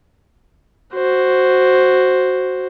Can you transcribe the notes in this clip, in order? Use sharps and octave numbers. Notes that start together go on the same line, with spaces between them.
F#4 C5